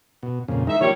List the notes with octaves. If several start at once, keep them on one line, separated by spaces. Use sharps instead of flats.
B2
F2 A#2 C#3
D#3 G#3 D#4 E5
D#3 F3 G3 A#3 G4 C#5